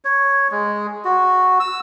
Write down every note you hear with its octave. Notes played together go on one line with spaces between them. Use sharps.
C#5
G#3
F#4
E6